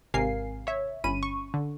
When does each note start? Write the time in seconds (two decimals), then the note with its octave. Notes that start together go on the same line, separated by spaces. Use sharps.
0.14 G#1 C3 A#4 F5 G#5 C7
0.67 C#5 E5
1.04 G1 C#4 B5 D#7
1.23 C#6
1.54 D3